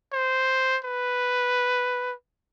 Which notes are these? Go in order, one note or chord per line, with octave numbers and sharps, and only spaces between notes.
C5
B4